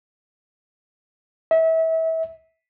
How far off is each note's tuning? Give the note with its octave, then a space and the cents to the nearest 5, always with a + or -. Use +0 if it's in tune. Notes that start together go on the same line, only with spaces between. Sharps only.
E5 -30